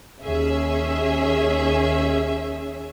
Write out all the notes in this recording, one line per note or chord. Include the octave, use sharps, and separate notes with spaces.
D#2 C#4 G#4 E5